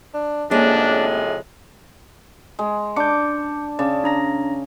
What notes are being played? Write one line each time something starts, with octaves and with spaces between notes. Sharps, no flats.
D4
A2 C3 F3 G#3 A#3 C#4 D4 G#4
G#3
D4 D6 G6 C#7
C#3 D5 A5 D6
D4 A#5 A#6